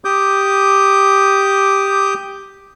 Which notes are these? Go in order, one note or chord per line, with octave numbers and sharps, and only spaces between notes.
G4 D6 D#6 G6